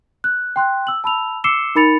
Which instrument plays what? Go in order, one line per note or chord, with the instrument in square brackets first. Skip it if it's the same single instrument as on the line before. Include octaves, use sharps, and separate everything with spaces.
[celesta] F#6
G5 C6 F#6
E6 F#7
A5 B5 E6 F7
D6 E6 C7 C#7 E7 G7
D#4 A#4 B5 A6 C#7 F7